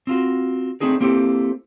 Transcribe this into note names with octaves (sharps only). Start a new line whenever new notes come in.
C4 F4 F#4
A3 C4 D4 D#4 G#4 A#4
A#3 C4 E4 G4 A4 C5